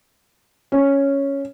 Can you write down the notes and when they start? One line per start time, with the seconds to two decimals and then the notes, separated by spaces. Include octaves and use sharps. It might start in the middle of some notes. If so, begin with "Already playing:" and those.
0.72 C#4